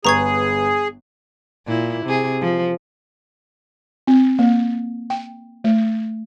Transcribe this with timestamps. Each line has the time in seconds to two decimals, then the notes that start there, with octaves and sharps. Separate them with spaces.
0.05 G1 G#4 B4 A#5 C#6 G#6
1.67 A#2 E4
2.05 C3 G#4
2.41 F3
4.07 C4
4.39 A#3
5.10 G5
5.64 A3